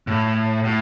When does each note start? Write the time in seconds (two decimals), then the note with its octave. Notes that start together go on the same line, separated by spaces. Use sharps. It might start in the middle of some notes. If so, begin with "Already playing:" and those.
0.07 A2
0.64 A2